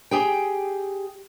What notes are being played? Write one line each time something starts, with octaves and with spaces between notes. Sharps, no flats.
G4 G#4 G5